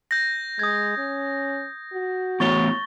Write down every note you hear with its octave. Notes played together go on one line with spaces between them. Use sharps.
G6 A#6
G#3 D#6 G#6
C#4
F#4
E2 A2 C#5 C#6 A6 G7